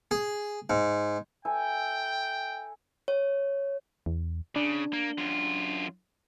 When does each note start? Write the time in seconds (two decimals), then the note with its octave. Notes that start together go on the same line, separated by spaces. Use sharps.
0.11 G#4
0.70 G#2
1.45 E4 A4 G5 G#5
3.08 C#5
4.06 E2
4.56 C#3 D4
4.93 A#3
5.18 F#2 F4